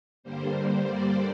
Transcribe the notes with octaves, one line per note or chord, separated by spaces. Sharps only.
G2 D3 G3 A#3 C5
C5
D5